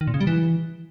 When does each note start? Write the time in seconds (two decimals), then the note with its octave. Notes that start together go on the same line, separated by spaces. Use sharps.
0.01 D#3
0.07 A#2
0.14 C#3
0.21 G3
0.27 E3